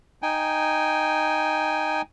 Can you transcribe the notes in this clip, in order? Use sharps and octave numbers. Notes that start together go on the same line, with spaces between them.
D#4 G5 G#5